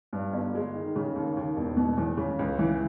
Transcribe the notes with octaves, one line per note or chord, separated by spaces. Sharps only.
G2
G1
G#3
D#3
C#3
D#2
D#2
E1
B2
E2
C#3
C#2
E3